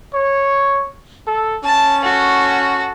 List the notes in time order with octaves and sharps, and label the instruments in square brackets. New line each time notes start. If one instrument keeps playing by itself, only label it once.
[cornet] C#5
A4
[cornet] C#4 [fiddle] A5
[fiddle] F#4 A4